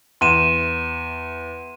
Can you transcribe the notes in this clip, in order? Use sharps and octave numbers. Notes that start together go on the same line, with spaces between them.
E2 C6 D#7 E7